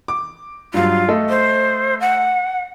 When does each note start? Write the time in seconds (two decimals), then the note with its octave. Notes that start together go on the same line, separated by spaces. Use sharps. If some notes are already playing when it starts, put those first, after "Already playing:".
0.08 D6
0.74 G2 F#3 F4
1.08 A3 A4 D#5
1.30 C5
2.00 F#5